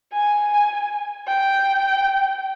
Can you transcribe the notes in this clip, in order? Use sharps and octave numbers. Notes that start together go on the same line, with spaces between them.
G#5
G5